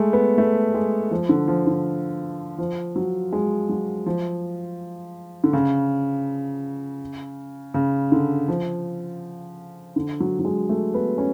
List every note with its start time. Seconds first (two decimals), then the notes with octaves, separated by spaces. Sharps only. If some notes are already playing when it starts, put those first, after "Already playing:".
Already playing: G#3 A3
0.13 B3
0.38 A3
0.74 G#3
1.11 F3
1.29 D3
1.48 F3
1.67 D3
2.58 F3
2.96 F#3
3.32 G#3
3.69 F#3
4.06 F3
5.44 D3
5.53 C#3
7.74 C#3
8.12 D3
8.48 F3
9.96 D3
10.20 F#3
10.39 F#3
10.45 G#3
10.69 A3
10.94 B3
11.18 C#4